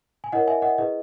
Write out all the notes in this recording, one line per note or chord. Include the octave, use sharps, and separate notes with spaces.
G#5
E4 A#4 C#5 D#5 F#5
E5 G#5
D#5 F#5
E4 G#4 B4 D#5